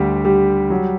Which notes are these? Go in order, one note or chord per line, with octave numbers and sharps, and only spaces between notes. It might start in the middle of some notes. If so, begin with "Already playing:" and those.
Already playing: D2 D3 G3 G4
G3 G4
F#3